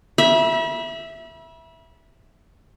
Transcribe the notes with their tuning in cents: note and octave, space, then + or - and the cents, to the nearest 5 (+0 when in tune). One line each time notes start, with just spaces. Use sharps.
E5 +0 B5 -35